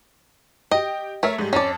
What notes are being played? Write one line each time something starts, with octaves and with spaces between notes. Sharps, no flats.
G4 D#5 G5
A3 A#4 C#5 E5
G#2 G3
F2 C#4 D5 A5